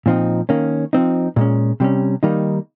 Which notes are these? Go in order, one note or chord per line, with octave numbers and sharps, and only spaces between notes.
A#2 F3 C4 D#4
D#3 A#3 C#4
F3 C4 D#4
A#2 G#3 C#4
C3 G3 C#4
D#3 G3 A#3 D#4